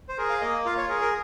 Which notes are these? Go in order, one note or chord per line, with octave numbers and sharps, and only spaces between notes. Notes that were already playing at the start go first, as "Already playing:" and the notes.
C5
G#4 A#4
F5
A#3 D#5
F4 F5
C#5
G#4 A#4
A#4